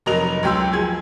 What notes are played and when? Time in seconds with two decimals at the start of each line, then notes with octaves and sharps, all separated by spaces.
0.06 F1 F#3 A#4 D#5 F7
0.43 C#2 F#3 G5 C6 E6
0.73 F3 G#4 G#6